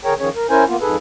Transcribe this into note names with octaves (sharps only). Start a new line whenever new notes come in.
D3 G#4 A#4 C#5 G5 A#5
D#3 F3 C#4 G#4 C#5
A#4
C#4 E4 A#4 C5 G#5
A#3 B3 F4
F2 G#2 G#4 A4 B4